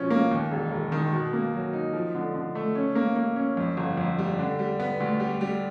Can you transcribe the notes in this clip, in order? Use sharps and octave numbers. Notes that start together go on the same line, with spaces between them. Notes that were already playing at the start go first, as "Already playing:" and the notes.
Already playing: B2 F3 C#4
A#3
D#2
E1
E1
D#3
B2
A#3
F#3
D#4
F3
D3
D3
A3
C#4
A#3
A#3
C#4
F2
G1
F2
G3
D3
G3
B3
D2
G3
G3